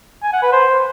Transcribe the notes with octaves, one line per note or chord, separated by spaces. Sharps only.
G#5
F#5
B4
C5